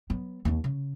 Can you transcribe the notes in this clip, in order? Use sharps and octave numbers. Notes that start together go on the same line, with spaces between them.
F#3 B3
D#2 C4
C#3